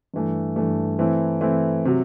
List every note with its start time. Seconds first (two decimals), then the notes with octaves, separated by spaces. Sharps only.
0.14 G2 E3 A3
0.56 G2 E3 A3
0.99 E3 A3 C4 E4
1.41 E3 A3 C4 E4
1.85 C3 F#3